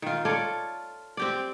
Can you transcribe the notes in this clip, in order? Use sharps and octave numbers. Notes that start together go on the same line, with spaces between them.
D#3 F4
F4 A4 C#5 D5
C4 G4 D5